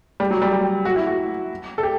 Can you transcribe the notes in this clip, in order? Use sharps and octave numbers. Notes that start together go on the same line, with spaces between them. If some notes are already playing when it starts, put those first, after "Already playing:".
G3
F#3
G3
G3
F#4
E4
F#4
A4
G4